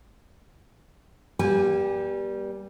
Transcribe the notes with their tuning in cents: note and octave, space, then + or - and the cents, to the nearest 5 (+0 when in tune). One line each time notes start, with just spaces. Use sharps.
G3 +0 B3 -40 G#5 -30